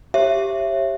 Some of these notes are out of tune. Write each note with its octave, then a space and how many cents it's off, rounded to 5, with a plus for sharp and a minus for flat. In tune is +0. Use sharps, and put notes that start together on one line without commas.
G4 +0 C#5 -35 E5 +20